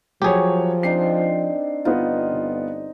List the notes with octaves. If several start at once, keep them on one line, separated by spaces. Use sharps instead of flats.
F3 F#3 G4 G#4 C#5
C4 D4 D#4 C7
G1 B3 D#4 F4